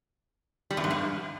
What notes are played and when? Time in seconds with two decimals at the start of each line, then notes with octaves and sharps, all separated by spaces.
0.71 G3
0.77 E2
0.84 G#2
0.91 G2